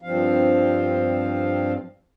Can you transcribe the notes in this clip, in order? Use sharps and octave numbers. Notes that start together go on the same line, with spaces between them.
G2 F3 C4 F5